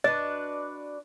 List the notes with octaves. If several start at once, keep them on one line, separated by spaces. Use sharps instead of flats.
D4 F#4 B4 D#5